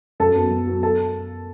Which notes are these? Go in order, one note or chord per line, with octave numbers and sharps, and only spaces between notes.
F#2 A4 A5
F#3 B3
F#2
F#3 B3
A4 A5